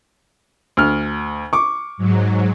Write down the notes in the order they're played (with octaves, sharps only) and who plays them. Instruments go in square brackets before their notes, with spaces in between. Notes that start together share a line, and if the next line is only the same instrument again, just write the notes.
[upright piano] D2 F6
C#6 D6
[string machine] G#2 F#3